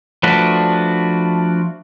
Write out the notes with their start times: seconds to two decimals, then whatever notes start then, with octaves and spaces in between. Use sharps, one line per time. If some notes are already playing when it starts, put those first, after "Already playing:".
0.23 F3 A3 D4 F#4 B4